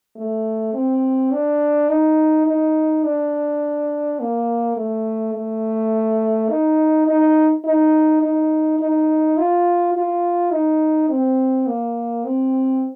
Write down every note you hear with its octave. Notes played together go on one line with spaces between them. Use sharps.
A3
C4
D4
D#4
D#4
D4
A#3
A3
A3
D#4
D#4
D#4
D#4
D#4
F4
F4
D#4
C4
A#3
C4